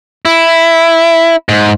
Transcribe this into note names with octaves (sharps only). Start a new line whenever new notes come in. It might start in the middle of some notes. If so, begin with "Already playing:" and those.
E4
G#2